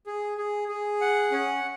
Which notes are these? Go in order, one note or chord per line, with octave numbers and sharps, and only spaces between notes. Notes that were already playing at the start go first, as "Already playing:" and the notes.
G#4
G#4
G#4
F#5
C#4